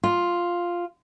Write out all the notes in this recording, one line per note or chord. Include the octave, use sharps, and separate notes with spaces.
F4